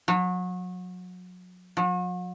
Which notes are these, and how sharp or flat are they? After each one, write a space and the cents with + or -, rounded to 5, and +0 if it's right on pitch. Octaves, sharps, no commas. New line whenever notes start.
F#3 -30
F#3 -45